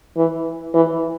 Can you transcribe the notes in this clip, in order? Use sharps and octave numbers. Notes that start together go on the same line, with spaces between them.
E3
E3